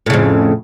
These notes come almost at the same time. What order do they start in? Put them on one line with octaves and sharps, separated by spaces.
A2 C#3 F2